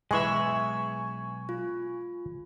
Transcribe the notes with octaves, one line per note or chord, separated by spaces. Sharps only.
B1 E3 G#3 G#4 E5 G#5 C#6
F4